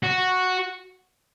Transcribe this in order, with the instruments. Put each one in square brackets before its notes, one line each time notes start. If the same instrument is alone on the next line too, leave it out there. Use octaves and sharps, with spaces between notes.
[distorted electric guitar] F#4